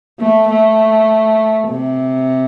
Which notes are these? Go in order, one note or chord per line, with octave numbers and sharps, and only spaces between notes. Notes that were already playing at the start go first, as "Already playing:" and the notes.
A3
A3
C3